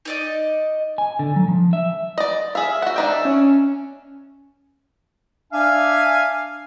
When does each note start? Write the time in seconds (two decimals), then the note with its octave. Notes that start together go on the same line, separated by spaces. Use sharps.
0.05 D#4 D5 D#5
0.98 G#5
1.19 D3
1.36 F#3
1.48 F3
1.73 E5
2.18 D5 D#5
2.55 G#4 E5 F5
2.82 F#4 F#5
2.96 D4 D#4 G5
3.25 C#4
5.53 D4 E5 F5 G#5